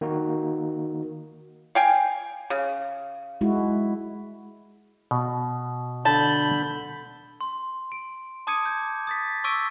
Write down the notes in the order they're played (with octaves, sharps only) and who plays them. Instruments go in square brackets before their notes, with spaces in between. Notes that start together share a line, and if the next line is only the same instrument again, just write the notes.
[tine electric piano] D#3 A#3 D#4 F#4
[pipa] F5 G5 G#5
C#3
[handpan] G#3 E4 F#4
[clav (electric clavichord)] B2
[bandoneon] D3 B5 G6 [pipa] A5
[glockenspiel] C6
D7
A5 D6 D#6 G#6 C#7 D#7
G6 G#6
D#6 A6 B6
C#6 D6 E6 B6 D7 D#7